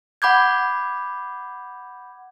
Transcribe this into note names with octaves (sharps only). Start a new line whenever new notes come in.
F#5 B5 D6 G6 G#6